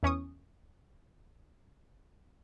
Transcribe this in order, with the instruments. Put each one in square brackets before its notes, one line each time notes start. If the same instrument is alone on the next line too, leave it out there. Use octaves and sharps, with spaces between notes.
[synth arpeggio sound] E2 C#4 C#6 D#6